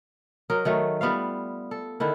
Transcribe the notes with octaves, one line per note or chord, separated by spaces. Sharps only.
F#3 A#4 D#5
D#3 F#3 A3
G3 B3 F4 F5
A4
D3 D#3 E4 A4